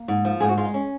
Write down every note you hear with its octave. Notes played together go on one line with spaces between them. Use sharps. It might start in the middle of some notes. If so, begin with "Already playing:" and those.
Already playing: A#3
G#2
F3
G#2 G#4
F#4
G#3 F4
D#4
C#4